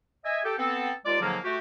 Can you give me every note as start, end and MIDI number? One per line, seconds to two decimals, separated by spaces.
0.25 0.39 75
0.25 0.39 76
0.25 0.39 80
0.44 0.54 67
0.44 0.54 69
0.44 0.54 79
0.58 0.90 59
0.58 0.90 60
0.58 0.90 69
1.05 1.19 39
1.05 1.19 56
1.05 1.19 65
1.05 1.19 74
1.21 1.37 44
1.21 1.37 50
1.21 1.37 53
1.21 1.37 54
1.21 1.37 58
1.44 1.58 57
1.44 1.58 66
1.44 1.58 67